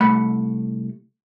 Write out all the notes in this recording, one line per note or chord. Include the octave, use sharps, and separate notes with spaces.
C2 A3 F#5 B5